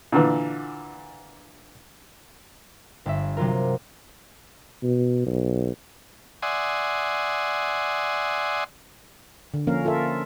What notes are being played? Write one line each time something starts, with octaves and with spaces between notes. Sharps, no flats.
A#2 D3 E3
G1 E5
C3 F#3 F4 A#4
B2
B1
D5 E5 F#5 G#5 C6 D#6
D3
F3 A#3 C#4 A#4 F5
F4 A4 A#4 E5